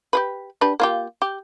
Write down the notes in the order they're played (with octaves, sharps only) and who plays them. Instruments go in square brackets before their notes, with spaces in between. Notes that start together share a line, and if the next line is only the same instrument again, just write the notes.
[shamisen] G4 G#4 B4
D4 G4 B4
A#3 F4 G4
G4